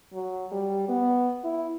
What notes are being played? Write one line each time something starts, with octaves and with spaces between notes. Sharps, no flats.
F#3
G3
B3
E4